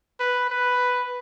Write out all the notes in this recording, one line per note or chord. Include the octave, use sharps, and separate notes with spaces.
B4
B4